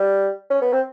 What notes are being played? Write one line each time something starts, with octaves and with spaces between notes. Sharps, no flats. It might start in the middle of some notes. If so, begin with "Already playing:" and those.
Already playing: G3
C#4
B3
C4